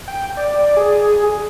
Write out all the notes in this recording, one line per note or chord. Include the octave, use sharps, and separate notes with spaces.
G5
D5
G#4